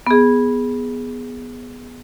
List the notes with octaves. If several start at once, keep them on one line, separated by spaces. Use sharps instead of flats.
B3 G#4